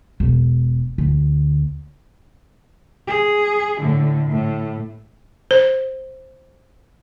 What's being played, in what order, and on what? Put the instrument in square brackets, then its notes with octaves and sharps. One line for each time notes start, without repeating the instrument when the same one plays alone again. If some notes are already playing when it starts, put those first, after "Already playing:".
[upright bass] E1
D2
[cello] G#4
A2 D3
A2
[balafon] C5